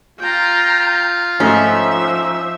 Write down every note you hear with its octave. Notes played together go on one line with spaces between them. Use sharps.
F4 G5 A#5
G#2 F3 A3 C#4 D#5 E5